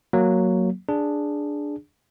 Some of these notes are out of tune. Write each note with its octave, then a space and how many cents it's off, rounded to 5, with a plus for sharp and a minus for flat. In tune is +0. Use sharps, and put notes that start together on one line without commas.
F#3 +0 A#3 +0
D4 +0 G#4 +0